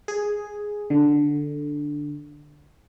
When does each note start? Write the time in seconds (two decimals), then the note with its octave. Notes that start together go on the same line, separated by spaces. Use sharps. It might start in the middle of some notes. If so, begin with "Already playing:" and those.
0.08 G#4
0.90 D3